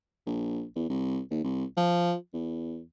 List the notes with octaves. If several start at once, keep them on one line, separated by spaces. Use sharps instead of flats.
A#1
E2
C2
D#2
C2
F3
E2